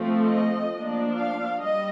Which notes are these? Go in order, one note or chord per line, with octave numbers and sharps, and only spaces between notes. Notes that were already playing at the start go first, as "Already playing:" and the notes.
Already playing: F3 A3 C4
D#5
F3 A#3 D4
F5
G3 D#5